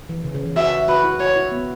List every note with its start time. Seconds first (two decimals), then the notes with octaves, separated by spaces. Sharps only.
0.09 E3
0.24 C#3
0.35 C#3
0.46 E3
0.56 F#4 E5
0.88 F#4 B4
1.04 E4
1.20 F#4 C#5
1.36 E4
1.52 B3